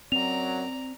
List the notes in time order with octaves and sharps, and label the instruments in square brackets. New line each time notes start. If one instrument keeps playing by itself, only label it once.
[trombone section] F#2 F#3 [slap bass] C4 [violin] D5 A#5 [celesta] F7